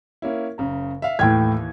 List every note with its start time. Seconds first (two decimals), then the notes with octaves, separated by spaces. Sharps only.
0.22 A#3 C#4 E4
0.58 F#1 C#3 A#5
1.02 E5 F5
1.19 D#2 A2 E3 G5 F6 G#6